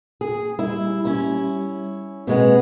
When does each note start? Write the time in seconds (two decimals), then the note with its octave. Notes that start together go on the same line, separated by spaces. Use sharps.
0.21 G#4
0.59 G3 E4
1.05 C#4 E4
2.27 B2 G#3 B3 C4